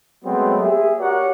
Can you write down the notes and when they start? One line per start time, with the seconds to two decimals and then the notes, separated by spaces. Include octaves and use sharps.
0.24 F#3 G#3 A3 B3 C4
0.59 A#3 G4 G#4 E5
0.98 F#4 G4 A#4 C#5 D5 F#5